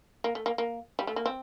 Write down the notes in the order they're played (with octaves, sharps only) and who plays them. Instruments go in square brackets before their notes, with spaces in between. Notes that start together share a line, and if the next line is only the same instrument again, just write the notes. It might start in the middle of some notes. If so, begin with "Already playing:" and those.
[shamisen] A#3
A3
A#3
A#3
G3
A3
A#3
C4